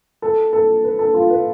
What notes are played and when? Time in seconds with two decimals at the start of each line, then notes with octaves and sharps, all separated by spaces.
0.22 A4
0.53 A4
0.84 B4
0.99 A4
1.14 F4
1.30 B4